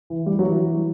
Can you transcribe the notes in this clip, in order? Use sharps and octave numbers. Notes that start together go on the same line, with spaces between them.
E3
G3
F#3
E3